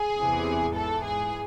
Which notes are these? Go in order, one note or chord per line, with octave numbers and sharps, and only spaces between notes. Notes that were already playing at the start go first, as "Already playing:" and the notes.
Already playing: G#4
E2 C3 E3
G#2 E3 A4
G#4